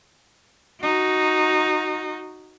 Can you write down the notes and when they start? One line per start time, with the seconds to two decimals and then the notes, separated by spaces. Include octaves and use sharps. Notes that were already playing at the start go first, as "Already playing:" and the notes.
0.82 D#4 F#4